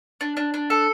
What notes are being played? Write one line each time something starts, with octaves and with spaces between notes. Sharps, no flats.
D4
D4
D4
A4